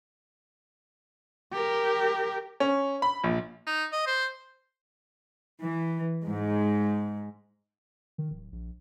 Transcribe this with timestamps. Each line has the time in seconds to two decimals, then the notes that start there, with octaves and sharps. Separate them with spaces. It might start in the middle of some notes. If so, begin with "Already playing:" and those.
1.53 G4 A#4
2.60 C#4
3.02 B5
3.24 A#1
3.67 D#4
3.93 D#5
4.07 C5
5.63 E3
6.25 G#2
8.18 D#3
8.31 D1
8.52 A#1